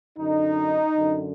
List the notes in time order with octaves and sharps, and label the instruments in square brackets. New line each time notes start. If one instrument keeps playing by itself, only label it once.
[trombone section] F#2 D3 D#4
F#2 D3